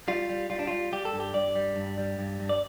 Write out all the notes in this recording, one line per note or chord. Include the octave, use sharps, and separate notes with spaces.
G3 F4
G3
G3 F4
D4
G3 F4
G3 G4
A4
G2
G4
G2 D5
G3
G2
G3
G2
G2
D5